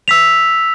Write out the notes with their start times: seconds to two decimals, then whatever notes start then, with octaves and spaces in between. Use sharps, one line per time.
0.08 E6 B6 F7